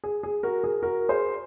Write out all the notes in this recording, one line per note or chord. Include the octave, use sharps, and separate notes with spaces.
G#4
G#4
F#4 A#4
G#4
F#4 A#4
G#4 C5